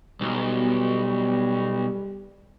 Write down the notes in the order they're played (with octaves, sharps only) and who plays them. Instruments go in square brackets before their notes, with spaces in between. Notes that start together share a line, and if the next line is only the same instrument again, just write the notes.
[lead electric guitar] B1 [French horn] G3